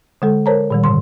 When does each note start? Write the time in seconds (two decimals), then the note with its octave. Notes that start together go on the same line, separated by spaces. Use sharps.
0.22 D3 G#3 A4
0.46 A#4 C5 C#5 A5 A#5
0.70 A#2 D#3 G3
0.84 G#2 D3 C6